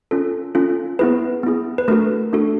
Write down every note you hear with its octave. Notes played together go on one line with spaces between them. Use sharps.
C#4 F4 A4
C#4 F4 A4
B3 E4 G#4 B4
B3 E4 G#4
B4
A3 D4 F#4 A4 A#4
A3 D4 F#4 A4